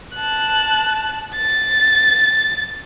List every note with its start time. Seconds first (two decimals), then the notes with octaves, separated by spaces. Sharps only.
0.16 A5 F#6
1.36 A6